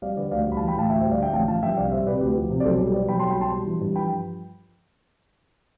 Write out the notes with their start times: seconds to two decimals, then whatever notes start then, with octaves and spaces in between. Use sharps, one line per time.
0.02 G3 D5 F5
0.17 D3 B4 D5
0.31 D2 D5 F5
0.46 G3
0.52 B5
0.57 F5 A5
0.61 E3
0.68 G5 B5
0.76 A2 F5 A5
0.90 D2 E5 G5
1.01 C5 E5
1.05 G3
1.11 D5 F5
1.19 D3 E5 G5
1.33 A1 F5 A5
1.48 F3 F5 A5
1.63 G2 E5 G5
1.77 C2 D5 F5
1.92 G3 C5 E5
2.06 C3 B4 D5
2.21 D2 G4 B4
2.36 F3
2.50 C3
2.60 D5
2.64 B1 A4 C5
2.79 G3
2.94 B2 B4 D5
3.08 B1 G5 B5
3.19 A5 C6
3.23 G3
3.30 G5 B5
3.38 B2 A5 C6
3.52 G3
3.66 E3
3.81 G2
3.96 F3 G5 B5